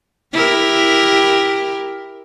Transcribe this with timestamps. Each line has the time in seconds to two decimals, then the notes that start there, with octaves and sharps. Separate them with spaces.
0.33 E4 G4 A#4